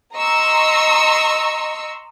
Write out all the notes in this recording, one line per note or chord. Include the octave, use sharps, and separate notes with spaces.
D#5 A#5 C6 C#6 E6